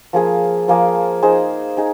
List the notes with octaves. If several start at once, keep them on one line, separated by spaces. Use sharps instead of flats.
F3 A#3 G#4 F5
F3 A#3 G#4 F5
D#4 G#4 C5
D#4 G#4